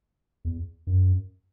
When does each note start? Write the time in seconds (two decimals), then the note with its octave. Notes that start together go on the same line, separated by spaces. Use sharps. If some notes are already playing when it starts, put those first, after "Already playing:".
0.45 E2
0.87 F#2